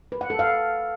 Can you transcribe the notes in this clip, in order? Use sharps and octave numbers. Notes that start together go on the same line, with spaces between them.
B4
F#5
A4
F5